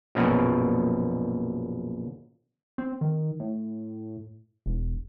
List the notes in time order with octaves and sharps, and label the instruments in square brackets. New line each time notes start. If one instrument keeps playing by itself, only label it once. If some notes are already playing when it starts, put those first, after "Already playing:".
[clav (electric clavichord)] A#1 F#2 B2
[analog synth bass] C4
D#3
A2
E1